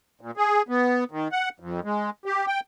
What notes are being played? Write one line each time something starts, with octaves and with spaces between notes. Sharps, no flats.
A#2
G#4
B3
D#3
F#5
F2
G#3
G4
G5